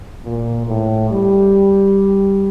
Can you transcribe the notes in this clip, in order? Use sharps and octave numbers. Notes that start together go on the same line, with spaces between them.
A#2
A2
G3